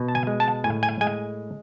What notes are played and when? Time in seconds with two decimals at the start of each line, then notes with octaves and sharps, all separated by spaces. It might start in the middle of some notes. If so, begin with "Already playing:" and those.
Already playing: B2
0.08 A5
0.15 G#5
0.27 G#3
0.40 A5
0.64 A2 G#5
0.83 G#5
1.01 G#3 G#5